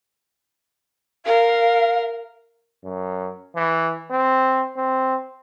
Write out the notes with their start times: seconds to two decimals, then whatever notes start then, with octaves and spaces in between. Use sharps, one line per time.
1.26 A#4 F5
2.84 F#2
3.56 E3
4.11 C4
4.77 C4